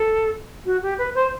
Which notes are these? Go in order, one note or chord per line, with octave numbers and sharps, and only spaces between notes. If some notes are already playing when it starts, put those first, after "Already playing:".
Already playing: A4
F#4
G4
B4
C5